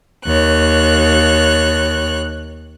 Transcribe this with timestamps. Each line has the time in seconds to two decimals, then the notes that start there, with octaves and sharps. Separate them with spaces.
0.25 D#2 C#5 F#6